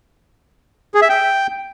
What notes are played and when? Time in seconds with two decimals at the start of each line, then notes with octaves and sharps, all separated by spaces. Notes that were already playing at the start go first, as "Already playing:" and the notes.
0.94 G#4
1.02 E5
1.09 G5